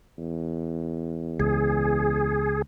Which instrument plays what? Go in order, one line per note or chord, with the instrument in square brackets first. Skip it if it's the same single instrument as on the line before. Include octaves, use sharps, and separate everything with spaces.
[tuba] E2
[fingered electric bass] C#2 [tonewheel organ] G#4